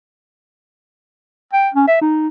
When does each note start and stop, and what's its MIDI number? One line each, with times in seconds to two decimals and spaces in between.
1.53 1.69 79
1.74 1.87 61
1.87 1.96 76
2.01 2.28 63